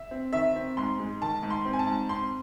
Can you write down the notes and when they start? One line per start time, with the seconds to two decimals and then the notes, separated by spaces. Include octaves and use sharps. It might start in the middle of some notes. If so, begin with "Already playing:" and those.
Already playing: E5
0.11 C4
0.33 D#3 E5
0.56 C4
0.77 G#2 C6
0.99 G#3
1.21 D#3 A5
1.43 G#2
1.50 C6
1.65 C4
1.73 G#5
1.79 A5
1.87 G#2
2.09 C4 C6